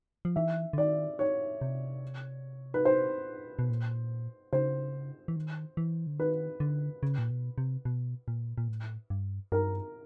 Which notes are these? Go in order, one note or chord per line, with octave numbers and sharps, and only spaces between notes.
F3
E3 E5
D3
D#3 D5
C#5
C3
B4
C5
B2
A#2
C#3 C5
E3
D#3
E3
D3
D#3 B4
D3
C#3
A#2
B2
C3
B2
A#2
A#2
A2
G2
G2 A#4